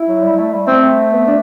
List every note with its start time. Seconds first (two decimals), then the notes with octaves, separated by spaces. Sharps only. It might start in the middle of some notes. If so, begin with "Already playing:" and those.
Already playing: E4
0.08 F#3
0.23 G3
0.38 A3
0.53 G3
0.67 A3 C4
1.12 B3
1.27 D4